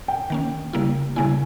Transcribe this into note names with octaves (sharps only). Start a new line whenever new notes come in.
G5
D#3 A#3 C#4
C#3 G3 A#3 E4
C#3 G3 A#3 E4 G#5